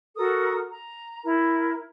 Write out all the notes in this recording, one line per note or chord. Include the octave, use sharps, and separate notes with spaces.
F#4 A4 A#4 D#6
A#5
E4 A#4